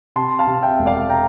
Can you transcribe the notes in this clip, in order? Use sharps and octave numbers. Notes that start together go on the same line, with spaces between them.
C3 A5 C6
F5 A5
C3
E5 G5
E1
D5 F5
G5 A#5